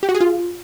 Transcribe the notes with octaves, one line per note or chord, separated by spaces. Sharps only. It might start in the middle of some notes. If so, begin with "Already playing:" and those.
G4
F#4
G#4
F4